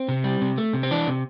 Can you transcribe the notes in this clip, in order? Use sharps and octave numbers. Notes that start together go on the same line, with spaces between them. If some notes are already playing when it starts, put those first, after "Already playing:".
Already playing: C4
C3
G3
C3
A3
C3
C4
E3 D4
C3